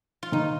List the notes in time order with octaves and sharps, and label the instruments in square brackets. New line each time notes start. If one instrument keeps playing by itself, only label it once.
[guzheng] F4
[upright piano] D#3 [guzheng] D#4